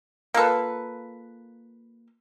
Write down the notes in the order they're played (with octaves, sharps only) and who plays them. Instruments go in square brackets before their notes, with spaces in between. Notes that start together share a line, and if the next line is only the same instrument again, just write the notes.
[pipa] A#3 F4 A4 B4